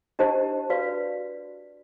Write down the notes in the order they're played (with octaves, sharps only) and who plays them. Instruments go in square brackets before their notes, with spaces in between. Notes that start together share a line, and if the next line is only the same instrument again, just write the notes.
[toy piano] D4 E4 G4 C5 D#5 A5
F#4 B4 D5 F5